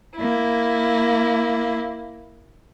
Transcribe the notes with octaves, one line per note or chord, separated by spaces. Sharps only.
A#3 E4